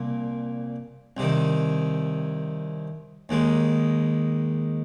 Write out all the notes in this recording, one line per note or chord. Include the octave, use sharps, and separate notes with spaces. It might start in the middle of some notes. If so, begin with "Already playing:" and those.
Already playing: C2 A#2 A#3
C2 C3 D#3
D#2 D#3 G#3